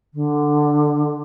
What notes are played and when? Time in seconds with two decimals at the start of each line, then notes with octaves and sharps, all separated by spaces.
0.14 D3